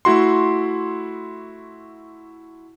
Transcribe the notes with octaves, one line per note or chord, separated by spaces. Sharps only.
A3 E4 F#4 C6